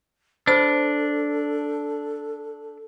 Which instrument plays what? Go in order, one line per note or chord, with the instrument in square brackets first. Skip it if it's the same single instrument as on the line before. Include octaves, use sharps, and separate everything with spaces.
[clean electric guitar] D4 [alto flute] A4 [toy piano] C5 B5 E6